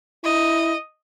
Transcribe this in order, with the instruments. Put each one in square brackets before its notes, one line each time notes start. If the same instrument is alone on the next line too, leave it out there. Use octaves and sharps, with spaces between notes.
[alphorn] E4 [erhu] D#5